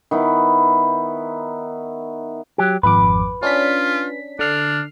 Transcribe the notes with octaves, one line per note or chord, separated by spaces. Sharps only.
D#3 B3 E4
F#3 G4
G#1 F2 B4 D6
C#4 D4 F4 B6
D3 D4 F6 C7